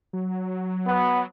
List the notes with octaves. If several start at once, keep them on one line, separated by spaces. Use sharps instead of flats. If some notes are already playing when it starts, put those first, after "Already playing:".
F#3
B3